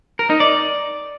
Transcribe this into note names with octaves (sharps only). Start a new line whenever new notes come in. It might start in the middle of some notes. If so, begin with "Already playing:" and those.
A#4
D#4
D5